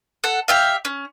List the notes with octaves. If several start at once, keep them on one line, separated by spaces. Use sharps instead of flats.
A4 F#5
G4 E5 F5
C#4